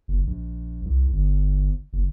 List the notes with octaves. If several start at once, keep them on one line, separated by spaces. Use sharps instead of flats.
F#1
A#1
C2
G1
F#1